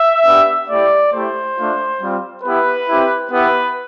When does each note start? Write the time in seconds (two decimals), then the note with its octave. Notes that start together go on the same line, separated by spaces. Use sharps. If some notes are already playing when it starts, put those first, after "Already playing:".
Already playing: E5
0.26 B3 D4 G4
0.69 A3 E4 G4 D5
1.13 A3 E4 G4 C5
1.57 A3 D4 F4
2.00 G3 C4 F4
2.44 B3 E4 G4 B4
2.88 C4 E4 G4
3.31 B3 E4 G4 B4